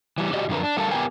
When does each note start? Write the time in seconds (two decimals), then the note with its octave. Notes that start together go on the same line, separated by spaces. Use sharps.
0.18 E3 G3
0.33 F#4 G4 D5 D#5
0.49 F#2 D3 F3 A#4 B4
0.63 D4
0.77 D3 G3 A4 A#4 F5 A5
0.91 B3 G4 A#4 B4 G5 G#5